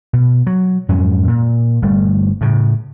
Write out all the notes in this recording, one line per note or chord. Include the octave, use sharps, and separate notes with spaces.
B2
F#3
F2 G#2 F#3 C#4
A#2
G1 G3 A3
A2 C#3